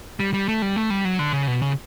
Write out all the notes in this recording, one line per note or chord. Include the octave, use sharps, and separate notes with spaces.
G3
G3
A3
G3
A3
G3
F#3
D3
C#3
B2
C#3